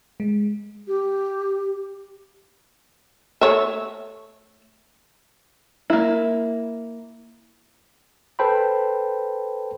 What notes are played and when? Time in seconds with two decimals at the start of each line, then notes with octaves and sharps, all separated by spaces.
0.20 G#3
0.88 G4
3.41 A3 C#5 E5
5.90 A#3 E4
8.39 A4 B4 C5 G5 A5 B5